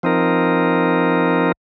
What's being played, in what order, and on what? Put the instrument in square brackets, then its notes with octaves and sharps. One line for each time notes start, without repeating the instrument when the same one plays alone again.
[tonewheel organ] F3 C4 D#4 A#4